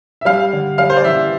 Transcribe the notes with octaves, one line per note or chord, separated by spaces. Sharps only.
E5
G3 F5
D3
G3 F5
C5
D5
E3 E5